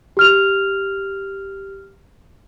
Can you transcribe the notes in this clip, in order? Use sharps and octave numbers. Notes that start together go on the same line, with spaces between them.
G4 F6 F7